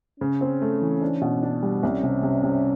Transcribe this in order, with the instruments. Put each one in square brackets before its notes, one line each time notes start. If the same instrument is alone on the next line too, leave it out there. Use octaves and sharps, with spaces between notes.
[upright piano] C#3 [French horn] C#4
[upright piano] C4
A3
E3
D4
B2
D4
G3
[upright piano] C2 [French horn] C#4
[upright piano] C3
C3
C3